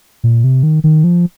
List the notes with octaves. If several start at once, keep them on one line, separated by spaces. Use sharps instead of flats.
A#2
C3
D#3
D#3
F3